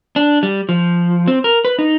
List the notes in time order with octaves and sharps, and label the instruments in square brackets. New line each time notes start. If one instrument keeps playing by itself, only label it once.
[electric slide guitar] D4
G3
F3
C4
A#4
B4
D#4